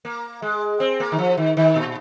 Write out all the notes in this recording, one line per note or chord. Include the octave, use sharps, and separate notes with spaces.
A#3
G#3
C4
A#3
D#3
F3
D#3
D#3
A#2